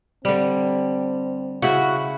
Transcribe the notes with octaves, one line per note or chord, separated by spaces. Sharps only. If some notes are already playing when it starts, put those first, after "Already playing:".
D3 G3 C4
C#3 E4 F#4